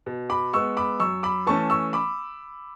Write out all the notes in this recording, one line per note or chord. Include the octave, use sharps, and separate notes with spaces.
B2
B5 D6
G#3 B3 C#6 E6
B5 D6
F#2 C#6 E6
B5 D6
E3 A3 C#4 A5 C#6
C#6 E6
B5 D6